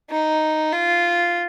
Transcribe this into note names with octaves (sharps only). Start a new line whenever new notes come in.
D#4
F4